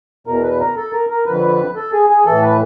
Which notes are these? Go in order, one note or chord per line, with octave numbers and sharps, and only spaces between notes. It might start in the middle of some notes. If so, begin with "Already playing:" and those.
E2 B2 A#4
B4
A#4
A4
A#4
A#4
F2 D3 B4
A4
G#4
G#4
A2 E3 A4
B4